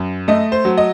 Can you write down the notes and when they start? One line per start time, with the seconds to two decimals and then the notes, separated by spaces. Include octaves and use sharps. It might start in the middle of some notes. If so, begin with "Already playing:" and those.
Already playing: F#2
0.28 A3 D#5
0.52 C5
0.65 F#3
0.77 D#5